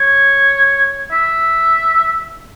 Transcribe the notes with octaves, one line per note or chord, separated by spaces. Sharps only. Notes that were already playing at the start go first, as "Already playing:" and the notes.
Already playing: C#5
E5